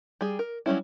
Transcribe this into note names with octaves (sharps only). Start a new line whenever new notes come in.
G3 G#4
A#4
F#3 G3 C#4 E4